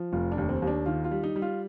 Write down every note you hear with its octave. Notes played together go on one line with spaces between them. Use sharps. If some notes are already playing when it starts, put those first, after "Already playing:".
Already playing: F3
F1 F4
D4
D#2
C4
D#2
D4
D#3 F4
F4
G3
D#4
G3
F4